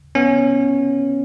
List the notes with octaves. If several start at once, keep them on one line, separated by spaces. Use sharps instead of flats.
B3 C#4